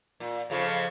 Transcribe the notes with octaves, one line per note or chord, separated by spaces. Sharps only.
A#2
F2 C#3 F3